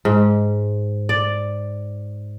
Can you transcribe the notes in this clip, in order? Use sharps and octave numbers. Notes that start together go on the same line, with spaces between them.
G#2
D5